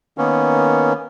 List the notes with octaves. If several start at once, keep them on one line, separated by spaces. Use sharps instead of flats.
D#3 A#3 B3 C#4